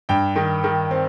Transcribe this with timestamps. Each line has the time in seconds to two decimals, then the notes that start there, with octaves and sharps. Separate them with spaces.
0.09 G2 G5
0.36 D#3
0.64 D#3
0.91 C4